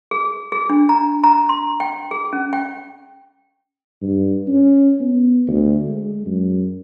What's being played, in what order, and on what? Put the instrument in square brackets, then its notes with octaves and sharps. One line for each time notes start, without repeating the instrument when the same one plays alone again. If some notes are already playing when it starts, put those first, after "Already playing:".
[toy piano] G#4
G#4
D4
A#5
A#5
C6
G5
G#4
C#4
G5
[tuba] G2
C#4
B3
D2
G#3
F#2